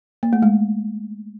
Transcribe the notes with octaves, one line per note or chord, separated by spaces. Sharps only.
A#3
A3
G#3